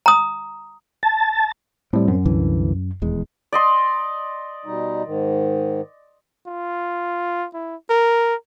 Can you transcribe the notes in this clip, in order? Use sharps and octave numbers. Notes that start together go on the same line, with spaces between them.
A#5 D#6
A5
A2 G3 C4
F#2
C2 D3 E3
D#1 E2 G#3
D5 D#5 C6
B2 G3 D#4
G#2 D#3
F4
E4
A#4